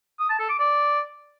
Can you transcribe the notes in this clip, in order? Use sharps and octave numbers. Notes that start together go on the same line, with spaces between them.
D#6
A5
A4
D6
D5